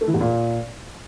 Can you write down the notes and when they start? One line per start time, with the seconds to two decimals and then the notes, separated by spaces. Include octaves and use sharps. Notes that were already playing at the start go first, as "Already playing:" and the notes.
0.01 A3
0.07 E3
0.14 E2
0.20 A#2